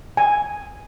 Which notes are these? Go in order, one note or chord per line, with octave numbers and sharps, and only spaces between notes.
G#5